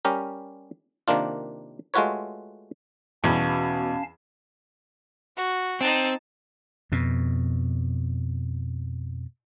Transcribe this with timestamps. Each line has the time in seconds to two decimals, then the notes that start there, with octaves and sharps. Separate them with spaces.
0.05 G3 C#4 G4 A#4
1.08 C3 D#3 A#3 D4 F4
1.94 G#3 A3 F4 F#4 B4 C#5
3.24 E2 B2 C#4 F5 A5
5.37 F#4
5.81 C4 D#4 A5
6.92 F2 B2